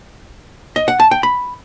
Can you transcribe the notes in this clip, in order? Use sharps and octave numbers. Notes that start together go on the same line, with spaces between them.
D#5
F#5
A5
G5
B5